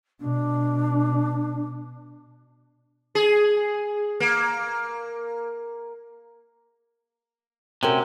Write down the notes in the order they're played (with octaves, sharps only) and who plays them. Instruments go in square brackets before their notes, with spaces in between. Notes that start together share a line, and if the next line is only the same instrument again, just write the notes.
[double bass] B2 [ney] D4
[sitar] G#4
A#3
[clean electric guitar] C3 [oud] C#4 F#4 A#4